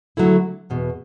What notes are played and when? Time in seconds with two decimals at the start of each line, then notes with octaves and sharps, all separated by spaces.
0.17 D3 F#3 A3 E4
0.70 E2 B2